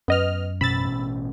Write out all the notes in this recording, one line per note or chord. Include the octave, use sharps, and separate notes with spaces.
F#2 B3 D#5 F6
A1 B2 C#4 B5 E6 A6